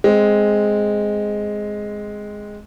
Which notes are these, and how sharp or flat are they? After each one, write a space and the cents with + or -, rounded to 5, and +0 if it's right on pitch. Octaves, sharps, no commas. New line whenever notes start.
G#3 +0 C4 +0